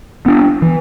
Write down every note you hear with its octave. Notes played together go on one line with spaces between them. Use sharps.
B3 D4
E3